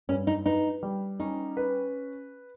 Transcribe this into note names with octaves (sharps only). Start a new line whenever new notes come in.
G2 C#4
D#4
D#4 B4
G3
C#4 D#4
B4